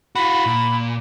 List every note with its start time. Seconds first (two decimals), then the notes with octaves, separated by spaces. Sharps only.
0.15 F4 F#4 B5
0.46 A#2